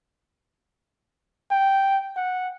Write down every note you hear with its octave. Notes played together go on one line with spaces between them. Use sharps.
G5
F#5